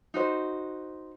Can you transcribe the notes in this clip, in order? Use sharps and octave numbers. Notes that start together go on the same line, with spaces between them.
D#4 F#4 C5